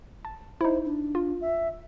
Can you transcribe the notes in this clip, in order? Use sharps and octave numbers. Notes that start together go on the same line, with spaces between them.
A5
D#4 E4 C5
D4
F4
E5